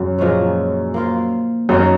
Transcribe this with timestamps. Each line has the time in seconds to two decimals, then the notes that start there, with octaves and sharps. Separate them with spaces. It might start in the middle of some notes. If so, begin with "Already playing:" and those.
Already playing: F#2 C#3 F#3
0.18 A#2 F3 G#3 C#4
0.94 A#3 F4 C5
1.69 F#2 A#3 D#4 A#4 C#5